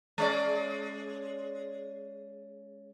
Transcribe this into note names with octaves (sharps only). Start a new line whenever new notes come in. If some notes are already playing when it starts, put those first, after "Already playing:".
G#3 C#4 D5